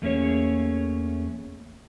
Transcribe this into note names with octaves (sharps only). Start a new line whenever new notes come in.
E2 A3 A#3 C#4 G#4 C#5